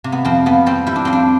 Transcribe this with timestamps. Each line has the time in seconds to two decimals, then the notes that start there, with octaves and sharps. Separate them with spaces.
0.04 C3
0.12 B3
0.25 F2 C4
0.46 F2 B3
0.66 G3 C4
0.87 G3 E4
0.96 D4
1.05 F2 C4
1.13 D4